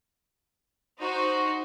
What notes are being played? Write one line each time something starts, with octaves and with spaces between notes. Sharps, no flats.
D#4 F#4 C5